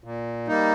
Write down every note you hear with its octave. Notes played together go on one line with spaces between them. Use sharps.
A#2
G3 A#3 D#4